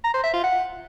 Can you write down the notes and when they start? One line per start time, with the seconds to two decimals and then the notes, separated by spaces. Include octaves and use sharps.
0.04 A#5
0.14 C5
0.24 E5
0.34 F4
0.43 F#5